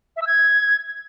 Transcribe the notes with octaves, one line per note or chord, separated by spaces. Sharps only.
E5
E6
G#6